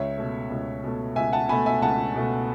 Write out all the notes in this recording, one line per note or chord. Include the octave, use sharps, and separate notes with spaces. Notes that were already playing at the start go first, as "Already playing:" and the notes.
Already playing: C#2 C#5 E5
B2 A3
C#2
B2 A3
C#2 E5 G#5
F#5 A5
B2 A3 G#5 B5
E5 G#5
C#2 F#5 A5
B2 A3